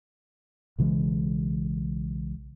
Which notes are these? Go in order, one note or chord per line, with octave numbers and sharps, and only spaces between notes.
B1 C#3 E3 G#3